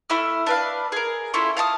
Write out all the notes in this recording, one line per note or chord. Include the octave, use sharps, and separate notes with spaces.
A3 E4 E5 F6
D4 B4 F5
G#4 A#4
C#4 E4 F4 A4
F5 A5 A#5 D#6